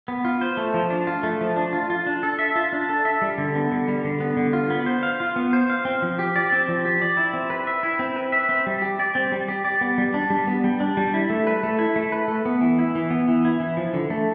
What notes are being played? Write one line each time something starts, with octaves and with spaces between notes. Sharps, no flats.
B3
F4
C5
A3
F3
D4
F4
A3
F3
D4
F4
F4
D4
A4
E5
F4
D4
A4
E5
G3
D3
B3
D3
G3
D3
B3
D3
F4
B3
C5
F5
F4
B3
C5
F5
C4
F3
G4
D5
C4
F3
G4
D5
E4
C4
B4
E5
E4
C4
B4
E5
C4
G3
G4
D5
C4
G3
G4
D5
B3
G3
D4
G3
B3
G3
D4
G3
E4
A3
B4
A3
E4
A3
B4
A3
B3
E3
E4
E3
B3
E3
E4
E3
F3
D3
A3